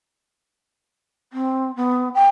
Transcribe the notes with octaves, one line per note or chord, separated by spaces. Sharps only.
C4
B3
G5